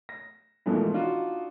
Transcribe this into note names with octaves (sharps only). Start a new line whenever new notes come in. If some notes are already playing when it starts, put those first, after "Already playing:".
A#6
G#2 B2 E3 F3 A3 A#3
D4 D#4 F4 F#4